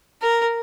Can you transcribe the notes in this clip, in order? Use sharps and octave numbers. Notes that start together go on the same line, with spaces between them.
A#4